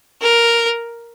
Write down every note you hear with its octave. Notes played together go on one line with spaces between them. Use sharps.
A#4